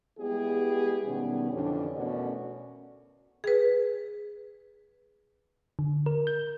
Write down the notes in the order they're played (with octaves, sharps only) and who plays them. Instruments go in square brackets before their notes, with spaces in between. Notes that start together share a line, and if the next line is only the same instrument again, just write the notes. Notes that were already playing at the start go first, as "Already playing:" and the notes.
[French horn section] G3 G#3 B3 E4 G4 G#4
B2 D#3 G3 B3 C#4
F2 D3 E3 C#4 D4
B2 A3 C#4 F#4 A#4 D5
[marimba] G#4 B4
[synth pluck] D3
A#4
G6